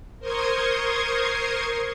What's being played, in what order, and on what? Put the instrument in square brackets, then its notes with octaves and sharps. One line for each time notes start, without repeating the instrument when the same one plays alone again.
[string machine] A#4 C5 C6 C#6 D#6 G#6